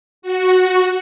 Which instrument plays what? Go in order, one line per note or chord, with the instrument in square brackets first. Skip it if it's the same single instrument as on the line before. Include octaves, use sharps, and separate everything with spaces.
[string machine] F#4